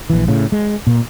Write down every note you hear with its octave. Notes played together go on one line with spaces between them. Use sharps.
A#1 E3
A2 C#3
G#3
A#2